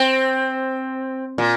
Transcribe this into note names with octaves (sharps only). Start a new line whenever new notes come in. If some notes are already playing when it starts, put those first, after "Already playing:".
Already playing: C4
A#2